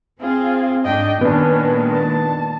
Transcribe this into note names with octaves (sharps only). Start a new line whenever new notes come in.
C4 F4 G#4
G#2 D4 D#5 G5
A#2 D#3 G#3 B3 C#4 D4
A5